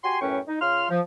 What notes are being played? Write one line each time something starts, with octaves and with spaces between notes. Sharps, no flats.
F#4 G4 G#5 C6
F#2 A2 C#4 B4 G5 C#6
D#4
C#3 F4 C6 F6
F3